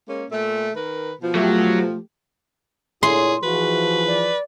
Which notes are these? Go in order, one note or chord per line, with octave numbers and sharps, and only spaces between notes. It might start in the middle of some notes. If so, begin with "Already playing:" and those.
G#3 A#3 C#4
A#2 A3
D#3 A#4 B4
B2 F3
F#3 A3 G4
A#2 E4 G#4 C#5 C6
E3 F3 F#4 G#4 B4
D5